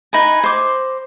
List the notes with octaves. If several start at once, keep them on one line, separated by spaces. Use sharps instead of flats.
D#4 B4 G#5
C5 D6